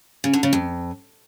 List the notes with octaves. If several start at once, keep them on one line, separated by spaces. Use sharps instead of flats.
C#3
D3
C#3
F2